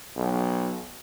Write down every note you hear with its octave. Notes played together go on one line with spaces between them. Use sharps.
B1